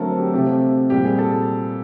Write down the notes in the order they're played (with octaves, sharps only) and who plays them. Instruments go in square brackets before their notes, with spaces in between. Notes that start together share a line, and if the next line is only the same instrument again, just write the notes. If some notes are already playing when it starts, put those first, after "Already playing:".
Already playing: [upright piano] D3 F#3 A3 C4 A4 A#4
G4
C3 F3 A3 G4
A#2 G3 C4 G4
G#4
A4